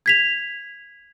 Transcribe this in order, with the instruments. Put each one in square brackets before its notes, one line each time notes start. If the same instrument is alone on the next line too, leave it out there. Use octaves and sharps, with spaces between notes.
[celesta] G#6 B6 F7